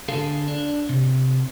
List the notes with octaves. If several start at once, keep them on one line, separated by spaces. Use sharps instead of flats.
D3 G#4 A4 F5
D4
C3